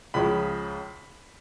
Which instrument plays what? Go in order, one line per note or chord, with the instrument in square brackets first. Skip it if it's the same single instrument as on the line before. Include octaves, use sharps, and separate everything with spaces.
[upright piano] C#2 C#3 F3 B5